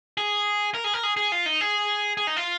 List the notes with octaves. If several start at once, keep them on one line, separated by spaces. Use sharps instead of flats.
G#4
A#4
G#4
A#4
G#4
G#4
F4
D#4
G#4
G#4
D#4
F4